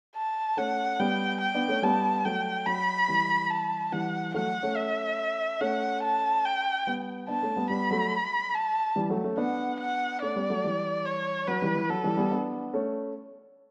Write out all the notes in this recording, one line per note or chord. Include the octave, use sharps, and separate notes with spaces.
A5
A3 C#4 F#5
G3 B3 G5
G5
B3 D4
A3 C#4
G3 B3 A5
F#3 A3 G5
F#3 B5
E3 G3
A5
E3 G3 F#5
F#3 A3 F#5
A3 C#4
E5
A3 C#4 F#5
A5
G5
G3 B3
B3 D4 A5
A3 C#4
G3 B3
G3 B3 B5
F#3 A3
A5
E3 G3
F#3 A3
A3 C#4
B3 D4 F#5
F#5
A3 C#4 D5
G3 B3
F#3 A3
E3 G3
C#5
F#3 B4
E3 G3
E3
F#3 A4
E3 G3
G3 B3
B3 D4
A3 C#4